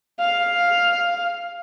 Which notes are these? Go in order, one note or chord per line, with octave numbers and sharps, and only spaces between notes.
F5